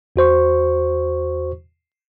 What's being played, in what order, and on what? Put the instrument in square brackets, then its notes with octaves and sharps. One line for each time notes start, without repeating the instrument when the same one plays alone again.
[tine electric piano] E2 F#4 C5 C#6